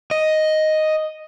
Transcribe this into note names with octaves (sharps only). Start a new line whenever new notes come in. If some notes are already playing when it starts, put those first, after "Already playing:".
D#5